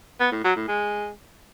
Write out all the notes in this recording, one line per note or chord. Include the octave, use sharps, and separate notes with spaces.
B3
A2
F#3
A2
G#3